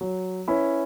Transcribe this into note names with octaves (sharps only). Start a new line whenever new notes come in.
F#3
C#4 E4 B4